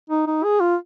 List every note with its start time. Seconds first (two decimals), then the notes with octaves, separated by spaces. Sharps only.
0.10 D#4
0.27 D#4
0.44 G#4
0.61 F4